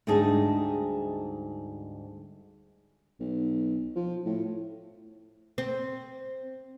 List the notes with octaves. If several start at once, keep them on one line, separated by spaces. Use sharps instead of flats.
D2 G#2 G3 D#4 G#4 A5
B1
F3
A2
C4